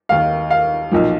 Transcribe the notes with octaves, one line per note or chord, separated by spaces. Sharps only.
D#2 D#3 F5
F5
B1 A#2 F3